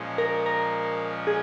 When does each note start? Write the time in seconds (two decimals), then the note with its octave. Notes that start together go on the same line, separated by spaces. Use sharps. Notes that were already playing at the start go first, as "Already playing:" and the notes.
Already playing: A#2 F3 G#3 C#4
0.18 A#4
0.46 A#4
1.27 G#4